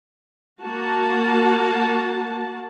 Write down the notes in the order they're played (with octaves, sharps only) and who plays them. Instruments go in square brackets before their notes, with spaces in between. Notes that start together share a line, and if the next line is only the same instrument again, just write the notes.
[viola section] A#3 F#4 A5